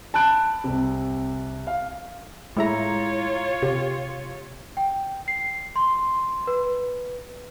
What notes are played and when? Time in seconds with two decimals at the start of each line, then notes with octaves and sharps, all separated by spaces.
0.14 A5 B5 F#6 D7
0.64 C2 C3
1.67 F5
2.57 A2 G#3 E4 F4 C#5 A#5
3.63 C3 G4
4.77 G5
5.28 C7
5.76 C6
6.47 B4